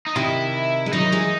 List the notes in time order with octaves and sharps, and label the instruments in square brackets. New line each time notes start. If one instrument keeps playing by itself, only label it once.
[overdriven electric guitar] D#4
[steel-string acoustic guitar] C3 D#3 [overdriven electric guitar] E4
[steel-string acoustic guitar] G#3
[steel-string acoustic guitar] D#3 F#3 [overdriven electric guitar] D#4
[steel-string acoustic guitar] E3 G#3